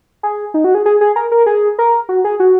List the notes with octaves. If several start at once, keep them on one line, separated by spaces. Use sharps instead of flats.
G#4
D#4
F#4
G#4
G#4
G#4
A#4
A#4
G#4
A#4
F#4
G#4
F#4